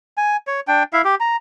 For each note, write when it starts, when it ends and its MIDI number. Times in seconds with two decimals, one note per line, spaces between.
0.17 0.37 80
0.47 0.60 73
0.68 0.83 62
0.68 0.83 79
0.93 1.02 64
0.93 1.02 76
0.93 1.02 77
1.05 1.15 67
1.20 1.36 82